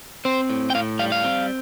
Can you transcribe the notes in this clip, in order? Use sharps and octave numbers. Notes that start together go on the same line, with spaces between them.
C4 C5
A2
G5
A2 F5
G3 F5
F5
C4